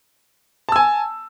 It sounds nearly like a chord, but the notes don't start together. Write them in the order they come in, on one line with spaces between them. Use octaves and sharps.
A5 E6 G#5